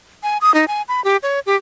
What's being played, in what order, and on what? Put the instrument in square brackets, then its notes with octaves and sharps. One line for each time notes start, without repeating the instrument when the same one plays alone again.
[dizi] G#5
D#6
D#4
G#5
B5
G4
C#5
G4